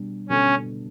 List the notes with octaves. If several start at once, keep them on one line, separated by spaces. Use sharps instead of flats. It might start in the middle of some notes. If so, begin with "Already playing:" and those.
Already playing: B2 G3 D4
B2 G3 C#4 D4 A4